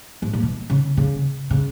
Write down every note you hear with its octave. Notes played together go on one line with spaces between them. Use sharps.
G#2
A#2
B2
C#3
C#3
C#3